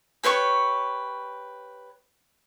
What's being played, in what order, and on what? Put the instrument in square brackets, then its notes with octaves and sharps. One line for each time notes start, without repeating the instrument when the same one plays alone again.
[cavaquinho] G4 B4 C#5 C#6